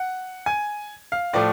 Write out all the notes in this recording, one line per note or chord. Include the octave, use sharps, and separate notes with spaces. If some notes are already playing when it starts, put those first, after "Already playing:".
Already playing: F#5
G#5
F5
A2 F3 A3 D5